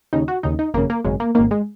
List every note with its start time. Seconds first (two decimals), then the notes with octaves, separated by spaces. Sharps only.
0.13 D#2 C#3 D#4
0.28 F#4
0.43 D#2 C#3 D#4
0.59 D#4
0.74 G#1 F#2 C#3 A#3
0.90 A#3
1.05 G#1 F#2 C#3 G#3
1.20 A#3
1.35 G#1 F#2 D#3 A#3
1.51 G#3